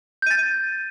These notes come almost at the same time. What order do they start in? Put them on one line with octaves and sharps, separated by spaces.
G6 D#7 A6